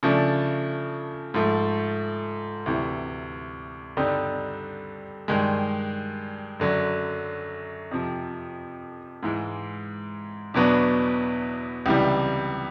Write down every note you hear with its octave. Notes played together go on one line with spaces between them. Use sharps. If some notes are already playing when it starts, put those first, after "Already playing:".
C#3 F3 A3 D4
G#2 F3 A3
D2 C3 E3
G2 D3 G3 C4 D#4
G2 D#3 G#3
F#2 D3 F#3
F2 C3 F3
G#2 E3 G#3
E2 B2 F#3 B3 D4
C#2 C3 E3 G3